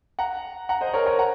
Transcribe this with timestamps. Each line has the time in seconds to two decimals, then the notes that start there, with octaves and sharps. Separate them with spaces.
0.19 F#5 A#5
0.69 F#5 A#5
0.81 C5 D#5
0.93 A#4 C#5
1.06 A#4 C#5
1.19 F#5 A#5